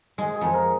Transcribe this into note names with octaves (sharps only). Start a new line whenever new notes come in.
G#3 G#4
G#4
F2
A#4